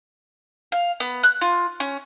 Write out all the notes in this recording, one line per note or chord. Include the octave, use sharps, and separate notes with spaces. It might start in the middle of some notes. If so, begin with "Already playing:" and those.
F5
B3
F#6
F4
C#4